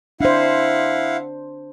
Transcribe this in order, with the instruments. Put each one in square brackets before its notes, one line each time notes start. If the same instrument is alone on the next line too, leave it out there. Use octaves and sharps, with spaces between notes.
[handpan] D4 C5 [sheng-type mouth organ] E4 F5 F#5